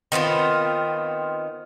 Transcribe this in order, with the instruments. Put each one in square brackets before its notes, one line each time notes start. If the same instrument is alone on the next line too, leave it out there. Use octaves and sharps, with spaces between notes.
[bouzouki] D#3 B3 C4 F4